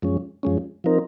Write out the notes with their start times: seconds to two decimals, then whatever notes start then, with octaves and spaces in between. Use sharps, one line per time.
0.02 F#2 F3 G#3 C#4
0.43 F#2 F3 G#3 C#4
0.84 F3 C4 D#4 A#4